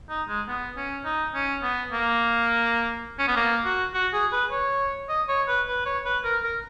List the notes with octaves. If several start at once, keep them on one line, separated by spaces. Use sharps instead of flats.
D#4
G#3
B3
C#4
D#4
C#4
B3
A#3
C#4
B3
A#3
F#4
F#4
G#4
B4
C#5
D#5
C#5
B4
B4
C#5
B4
A#4
A#4